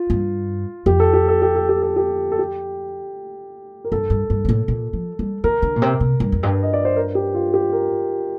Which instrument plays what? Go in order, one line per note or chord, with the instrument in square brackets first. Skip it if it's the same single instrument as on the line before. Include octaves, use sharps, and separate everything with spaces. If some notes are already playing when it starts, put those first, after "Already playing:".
Already playing: [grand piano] F4
[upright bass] G2
[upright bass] F2 [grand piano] G4
[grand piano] A4
G4
A4
G4
A4
G4
A4
G4
A4
G4
A#4
[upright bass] G2 [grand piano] A4
[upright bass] G2
G2
A#2
A2
A#2
F3
G3
[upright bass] D#3 [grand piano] A#4
[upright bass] D3
A#2
C3
C3
G2
F2
G2
[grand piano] D#5
D5
C5
A#4
G4
F4
G4
A#4